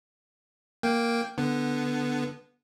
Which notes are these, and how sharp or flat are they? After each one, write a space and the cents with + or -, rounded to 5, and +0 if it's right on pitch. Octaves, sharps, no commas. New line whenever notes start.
A#3 +0 G5 +0
D3 +0 B3 +0